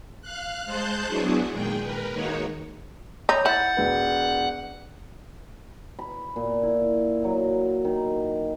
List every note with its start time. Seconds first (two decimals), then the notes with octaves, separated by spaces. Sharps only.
0.21 F5 F#6
0.66 G#3 C5 A5 C6 F#6 G6
1.07 F#3 B3 D4 E4 F#4 G#4
1.51 A#2 D#3 G#3 G#4 G5
1.82 A#4 B4
2.14 D#3 G#3 A#3 D#4 F#4 C#5
3.29 D#4 C#5 B5 G6
3.46 E4 F#5 G6 A6
3.77 E1 B4
5.99 B5
6.36 A#2
6.63 E4
7.24 F#3
7.85 D#3